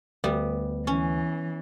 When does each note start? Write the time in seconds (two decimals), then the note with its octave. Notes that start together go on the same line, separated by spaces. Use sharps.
0.24 D2 G3 B3
0.87 E3 C#4